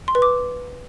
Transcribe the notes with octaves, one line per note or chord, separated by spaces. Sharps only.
C6
B4
D6